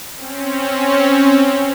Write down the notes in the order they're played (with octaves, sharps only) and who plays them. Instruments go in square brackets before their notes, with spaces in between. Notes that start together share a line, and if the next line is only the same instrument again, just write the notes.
[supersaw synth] C4 C#4